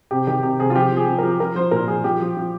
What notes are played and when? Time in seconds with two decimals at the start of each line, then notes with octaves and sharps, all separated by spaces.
0.11 C3 G4
0.27 D#3 G4
0.43 C3 G4
0.59 C3 G#4
0.70 F4
0.76 F3 G4
0.92 F3
0.97 G#4
1.07 F3
1.18 F3 A#4
1.40 F3 A#4
1.55 F3 C5
1.71 A#2 A#4
1.88 F3 G#4
2.04 F3 G4
2.20 F3
2.37 F3